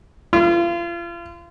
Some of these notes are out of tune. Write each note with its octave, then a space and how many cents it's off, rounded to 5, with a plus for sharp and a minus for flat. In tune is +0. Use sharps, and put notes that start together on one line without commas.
F4 -35